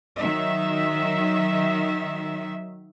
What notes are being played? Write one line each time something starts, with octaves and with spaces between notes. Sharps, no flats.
D#3 F#3 E5